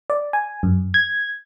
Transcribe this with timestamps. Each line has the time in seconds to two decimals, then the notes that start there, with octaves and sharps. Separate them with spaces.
0.10 D5
0.33 G#5
0.63 F#2
0.94 G#6